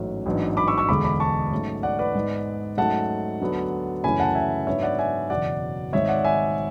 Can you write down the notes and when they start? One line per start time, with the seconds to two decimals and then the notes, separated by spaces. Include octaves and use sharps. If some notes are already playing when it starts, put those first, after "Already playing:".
Already playing: A1 G#2 F#3 A3 C#4
0.26 A1 G#2 F#3 B3 D4
0.57 B5 D6
0.68 C#6 E6
0.78 C#6 E6
0.89 E1 D2 D3 G#3 B5 D6
1.04 B5 D6
1.20 A5 C#6
1.51 G#2 F#3 A3 C#4
1.83 D5 F#5
1.99 B4 D5
2.14 G#2 G#3 B3
2.77 G#2 F#3 A3 C#4 F#5 A5
3.40 D2 D3 F#3 B3
4.04 F#2 C#3 E3 A3 C#4 G#5 B5
4.20 F#5 A5
4.35 E5 G#5
4.67 G#2 F#3 B3 D4 C#5 E5
4.83 D5 F#5
4.98 E5 G#5
5.30 F#1 E2 B2 F#3 D5 F#5
5.93 G#1 G#2 G#3 C#5 E5
6.09 D5 F#5
6.24 E5 G#5